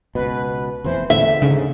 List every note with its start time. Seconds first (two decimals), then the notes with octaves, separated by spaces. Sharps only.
0.15 C#2 B2 B4
0.84 F1 E2 E3 C5
1.10 E2 A2 D3 E5
1.42 D#2 G#2 C#3